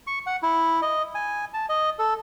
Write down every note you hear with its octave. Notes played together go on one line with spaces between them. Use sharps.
C#6
F#5
E4
D#5
G#5
A5
D#5
A4